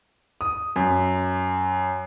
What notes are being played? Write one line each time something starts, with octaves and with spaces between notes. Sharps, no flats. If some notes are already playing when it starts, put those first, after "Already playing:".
D#6
F#2